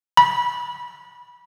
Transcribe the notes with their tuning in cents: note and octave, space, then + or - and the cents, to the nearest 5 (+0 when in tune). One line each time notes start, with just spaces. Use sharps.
B5 -25